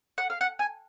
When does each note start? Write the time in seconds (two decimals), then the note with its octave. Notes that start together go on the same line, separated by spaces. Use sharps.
0.18 F#5
0.30 F5
0.41 F#5
0.59 G#5